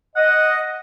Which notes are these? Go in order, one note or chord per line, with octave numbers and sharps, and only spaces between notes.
D#5 F#5